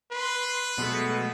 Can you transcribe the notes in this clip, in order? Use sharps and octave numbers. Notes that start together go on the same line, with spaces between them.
B4 C6
B2 F#3 G#3 A3